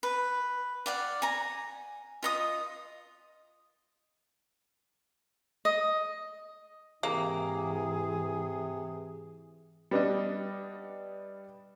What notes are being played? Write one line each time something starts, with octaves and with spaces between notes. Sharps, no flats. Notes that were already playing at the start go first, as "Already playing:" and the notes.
B4
D5 F5 F#5
G#5 A#5
F4 D#5 D#6
D#5
G#2 C3 E3 A#3 G#4
G3 B3 D4 D#5